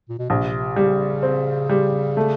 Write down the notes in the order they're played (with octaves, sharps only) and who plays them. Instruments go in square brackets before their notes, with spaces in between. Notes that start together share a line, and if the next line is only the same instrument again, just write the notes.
[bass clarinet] A#2
B2
[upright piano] A#1 [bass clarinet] C3
[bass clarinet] C#3 [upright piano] G3
[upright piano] C4
G3
A3